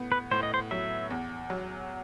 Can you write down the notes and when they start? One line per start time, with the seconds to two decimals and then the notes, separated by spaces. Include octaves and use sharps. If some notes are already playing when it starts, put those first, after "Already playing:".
Already playing: A2 B3
0.12 B4
0.31 A2 C5
0.43 D#5
0.54 C5
0.71 F#3 E5
1.10 E2
1.50 F#3